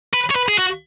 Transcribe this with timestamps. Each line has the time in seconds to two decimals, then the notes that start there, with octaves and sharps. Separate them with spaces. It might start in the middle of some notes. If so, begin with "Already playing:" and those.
0.14 B4
0.31 C#5
0.36 B4
0.48 G#4
0.58 F#4